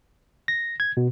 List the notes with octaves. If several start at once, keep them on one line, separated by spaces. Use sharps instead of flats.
A#6
G#6
B2